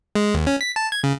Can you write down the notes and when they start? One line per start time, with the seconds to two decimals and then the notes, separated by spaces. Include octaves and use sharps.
0.15 G#3
0.34 D#2
0.47 C#4
0.61 B6
0.76 A5
0.92 G#6
1.04 C#3